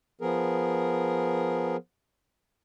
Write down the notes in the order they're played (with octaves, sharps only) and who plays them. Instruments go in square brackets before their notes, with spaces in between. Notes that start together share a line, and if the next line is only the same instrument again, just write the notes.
[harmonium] F3 B3 G#4 A#4